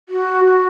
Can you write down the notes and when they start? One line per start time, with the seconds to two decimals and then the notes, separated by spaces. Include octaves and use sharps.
0.09 F#4
0.45 F#4